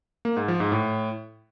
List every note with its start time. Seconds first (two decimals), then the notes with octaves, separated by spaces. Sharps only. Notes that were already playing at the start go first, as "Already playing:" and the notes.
0.25 A#3
0.37 G#2
0.48 F3
0.60 G#2
0.72 A2